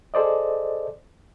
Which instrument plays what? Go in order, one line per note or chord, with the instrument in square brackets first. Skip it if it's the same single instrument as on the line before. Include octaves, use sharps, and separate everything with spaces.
[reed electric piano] G#4 A4 C5 D5 D#5